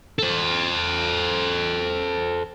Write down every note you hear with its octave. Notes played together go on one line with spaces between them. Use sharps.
A4 C5